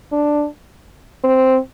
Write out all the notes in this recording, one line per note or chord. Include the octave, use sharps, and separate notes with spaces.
D4
C4